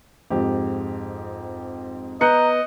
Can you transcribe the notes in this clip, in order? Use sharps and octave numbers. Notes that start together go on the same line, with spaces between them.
F2 G#2 G4
B3 D#5 A#5 F#6 G6 C#7